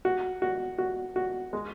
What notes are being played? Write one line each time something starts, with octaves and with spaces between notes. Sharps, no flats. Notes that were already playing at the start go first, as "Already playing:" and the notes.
F#4
F#4
F#4
F#4
G#3